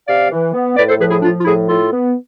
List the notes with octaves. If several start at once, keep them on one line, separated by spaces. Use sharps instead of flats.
C3 D5 F5
E3
B3
A2 B4 D5
A4 C5
F3 G#4 B4
E4 G#4
F3 D4 F4
F4
A2 E4 G#4
A2 F4 A4
B3